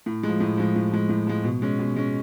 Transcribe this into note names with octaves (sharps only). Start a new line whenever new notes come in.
A2
F3 G#3
A2
F3 G#3
A2
F3 G#3
A2
F3 G#3
B2
G#3 C#4
B2
G#3 C#4